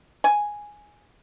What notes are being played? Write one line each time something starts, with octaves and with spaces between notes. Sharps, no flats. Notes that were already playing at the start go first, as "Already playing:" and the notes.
G#5